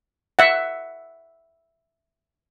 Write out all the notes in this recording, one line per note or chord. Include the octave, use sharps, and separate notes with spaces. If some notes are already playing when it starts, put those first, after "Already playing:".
E5 F#5